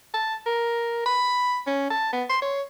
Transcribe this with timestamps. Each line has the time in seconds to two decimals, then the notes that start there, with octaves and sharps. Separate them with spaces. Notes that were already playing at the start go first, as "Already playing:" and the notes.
0.14 A5
0.46 A#4
1.06 B5
1.67 C#4
1.91 A5
2.13 B3
2.29 C6
2.42 C#5